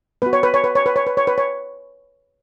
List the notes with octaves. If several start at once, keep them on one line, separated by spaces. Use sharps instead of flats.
B3 F#4 B4
C#5
B4
C#5
B4
C#5
B4
C#5
B4
C#5
B4
C#5